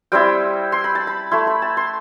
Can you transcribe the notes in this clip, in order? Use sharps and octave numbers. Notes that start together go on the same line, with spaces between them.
G3 C4 E4 G5
C6
B5
A5
B5
A3 E4 C6
B5
A5
C6